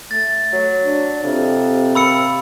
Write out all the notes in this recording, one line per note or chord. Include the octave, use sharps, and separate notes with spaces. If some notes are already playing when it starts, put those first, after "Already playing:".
A3 A6
F#3
D4
F2 C3
A#3 B5 E6 C#7